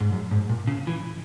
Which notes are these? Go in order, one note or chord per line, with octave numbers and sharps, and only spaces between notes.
G#2
F#2
G#2
A#2
C#3
E3